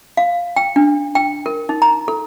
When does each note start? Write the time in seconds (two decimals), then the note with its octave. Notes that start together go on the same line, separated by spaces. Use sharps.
0.17 F5
0.56 G5
0.76 D4
1.15 G5
1.46 A#4
1.69 D#4
1.82 A#5
2.08 A4